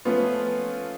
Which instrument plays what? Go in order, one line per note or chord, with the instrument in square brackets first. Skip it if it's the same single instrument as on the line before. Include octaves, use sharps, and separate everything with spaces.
[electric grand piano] F3 A3 C#4 F4 [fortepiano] B3